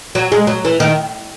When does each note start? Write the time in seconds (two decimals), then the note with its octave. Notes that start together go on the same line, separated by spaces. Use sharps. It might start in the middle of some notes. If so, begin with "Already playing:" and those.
0.15 F#3
0.32 G#3
0.47 F#3
0.65 E3
0.80 D#3